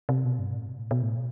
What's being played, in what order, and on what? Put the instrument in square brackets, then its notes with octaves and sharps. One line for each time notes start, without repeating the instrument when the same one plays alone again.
[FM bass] C3
B2
G2
A2
B2
A2
B2
A2
B2